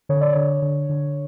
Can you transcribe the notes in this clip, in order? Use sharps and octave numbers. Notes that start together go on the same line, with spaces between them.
D3 C#5
D5
D3 C#5
D3
D3